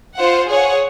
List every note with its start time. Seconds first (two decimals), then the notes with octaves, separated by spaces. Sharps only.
0.16 F4 C5 F#5
0.49 G#4 C#5 F#5